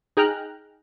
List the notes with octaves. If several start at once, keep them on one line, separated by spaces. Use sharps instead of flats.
D#4 G#4 G5 A#5 F6 F#6